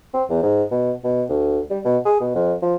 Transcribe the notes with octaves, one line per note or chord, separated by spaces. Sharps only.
C4
E2
G#2
B2
B2
D2
G3
B2
G#4
B2
F2
F3